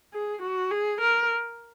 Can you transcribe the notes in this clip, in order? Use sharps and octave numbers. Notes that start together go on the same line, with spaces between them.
G#4
F#4
G#4
A#4